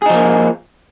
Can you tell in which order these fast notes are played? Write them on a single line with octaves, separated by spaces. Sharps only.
G#4 D#4 F3 A#3